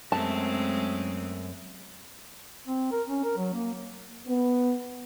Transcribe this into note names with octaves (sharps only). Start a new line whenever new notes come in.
F#2 G#3 A3 C4 A5
C4
A#4
C#4
A#4
F#3
A#3
B3